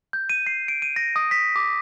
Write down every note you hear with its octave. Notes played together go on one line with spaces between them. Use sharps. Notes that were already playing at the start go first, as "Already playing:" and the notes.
G6
D#7
C7
D7
D#7
A#6
D#6
B6
D6